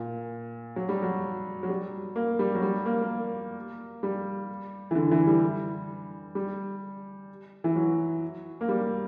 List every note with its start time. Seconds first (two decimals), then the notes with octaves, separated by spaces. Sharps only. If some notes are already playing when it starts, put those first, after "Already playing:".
Already playing: A#2
0.76 F#3
0.89 G3
1.03 F#3
1.63 F#3
1.69 G3
2.16 A#3
2.39 G3
2.55 F#3
2.62 G3
2.86 A#3
3.02 A#3
4.03 G3
4.91 E3
4.95 D3
5.11 E3
5.27 G3
6.35 G3
7.64 E3
7.75 F#3
8.61 A#3
8.68 G3